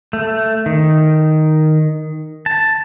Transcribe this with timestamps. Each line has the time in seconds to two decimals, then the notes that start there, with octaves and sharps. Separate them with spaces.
0.13 A3
0.66 D#3
2.46 A5